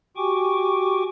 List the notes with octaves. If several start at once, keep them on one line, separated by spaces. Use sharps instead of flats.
F#4 G4 G5 G#5 C#6 D6